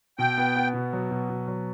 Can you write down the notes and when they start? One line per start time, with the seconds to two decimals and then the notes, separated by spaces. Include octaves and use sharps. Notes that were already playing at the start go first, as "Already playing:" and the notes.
0.18 B2 G5
0.38 B3
0.56 B3
0.74 B2
0.93 F#3
1.11 B2
1.30 B2
1.48 F#3